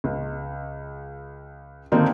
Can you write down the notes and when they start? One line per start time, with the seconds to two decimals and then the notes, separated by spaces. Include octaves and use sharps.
0.04 C#2
1.92 D3 D#3 A#3 C4 D4 D#4